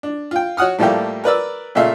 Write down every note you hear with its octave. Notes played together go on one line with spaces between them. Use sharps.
D4
F4 G5
F#4 C#5 F#5 D#6 F6
A2 F3 G3 A3 A#3 G4
A#4 B4 D5 E6
A#2 C#3 A3 E5 F5